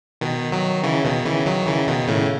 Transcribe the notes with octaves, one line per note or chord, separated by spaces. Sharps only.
B2 D#3
D#3 F#3
C#3 E3
B2 D#3
C#3 E3
D#3 F#3
C#3 E3
B2 D#3
A2 C#3